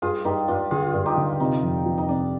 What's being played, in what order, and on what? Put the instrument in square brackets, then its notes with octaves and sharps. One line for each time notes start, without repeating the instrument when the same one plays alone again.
[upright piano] G2 [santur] F4 G#4
[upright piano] G2 [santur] D#4 G4
[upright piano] G2 [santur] D4 F4
[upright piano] D3 [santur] F4 G#4
[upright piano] G2
[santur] D#4 G4
[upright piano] D3
[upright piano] C3 [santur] D#4
[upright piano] F2
F3
[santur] D#4
[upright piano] C3 [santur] D4